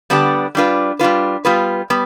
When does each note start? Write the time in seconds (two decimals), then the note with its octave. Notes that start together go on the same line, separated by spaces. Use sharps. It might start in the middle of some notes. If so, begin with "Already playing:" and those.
0.10 D3 G3 B3 D4 G4
0.55 G3 D4 F4 B4
0.99 G3 D4 F4 B4
1.45 G3 B3 F4 B4
1.90 G3 B3